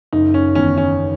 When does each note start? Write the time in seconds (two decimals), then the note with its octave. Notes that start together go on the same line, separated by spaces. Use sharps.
0.13 F#1 D#4
0.34 C#4
0.55 E2 D#3 C#4
0.78 C#4